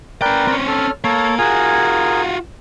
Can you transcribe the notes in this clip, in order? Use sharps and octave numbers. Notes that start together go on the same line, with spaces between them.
C#4 A#4 B4 D5 G5
C4 C#4
A4 F6
A#3 A4 C#5
F4 F#4 G#4 A#4 G#5